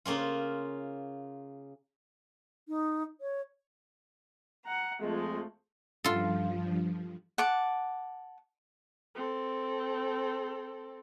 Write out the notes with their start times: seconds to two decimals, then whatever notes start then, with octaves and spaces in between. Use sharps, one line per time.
0.06 C#3 A#3 C#4 F4
2.68 D#4
3.21 C#5
4.64 F#5 A#5
5.01 F2 F3 G#3 A3
6.04 G2 F3 F4 A4
7.38 F#5 A5 D6
9.15 C4 A4